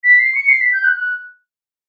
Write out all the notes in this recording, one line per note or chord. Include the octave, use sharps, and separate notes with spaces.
B6
C7
C#7
C7
B6
G6
F#6
F#6